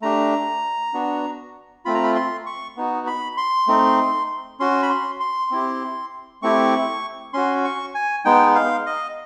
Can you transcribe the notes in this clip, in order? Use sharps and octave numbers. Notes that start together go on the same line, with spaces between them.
A3 D4 G4 A#5
B3 D4 F#4
A3 C4 F4 B5
A#5
B5
C6
C#6
B3 D#4 F#4
B5
C6
A3 C4 D#4
C#4 F#4 C6
B5
C6
C6
C4 E4 G4
A3 C4 E4 G4 C#6
C#4 F#4 C6
C#6
G#5
G#3 B3 D#4 G5
F5
D#5